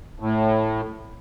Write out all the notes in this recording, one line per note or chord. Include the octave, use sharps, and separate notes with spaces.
A2